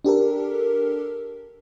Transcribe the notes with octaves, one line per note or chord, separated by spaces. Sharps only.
D4 G4 A4 A#4